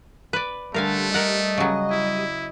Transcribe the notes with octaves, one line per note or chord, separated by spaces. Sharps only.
B4 D5
D3 G3 A3 A#4 F5 G#5
A#4 D#5 F#5
C#3 F#3
E4